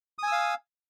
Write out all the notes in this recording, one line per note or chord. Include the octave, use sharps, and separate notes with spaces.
F5 G#5 D#6 E6